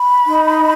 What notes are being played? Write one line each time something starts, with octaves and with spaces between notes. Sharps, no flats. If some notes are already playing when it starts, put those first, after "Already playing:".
Already playing: B5
D#4